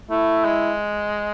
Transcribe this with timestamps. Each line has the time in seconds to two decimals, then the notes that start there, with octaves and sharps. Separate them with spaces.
0.10 A3 E4
0.45 G#3